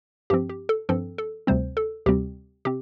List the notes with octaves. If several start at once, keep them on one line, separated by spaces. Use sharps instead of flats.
G2 F3 C4 G4
G4
A4
G2 F3 C4 A4
A4
D2 C3 G3 C4 C5
A4
D2 C3 G3 C4 G4
C3 C4 G4